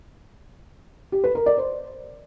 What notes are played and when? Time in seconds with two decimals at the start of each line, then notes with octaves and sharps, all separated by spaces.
1.12 G4
1.24 B4
1.35 A#4
1.46 D5
1.58 C5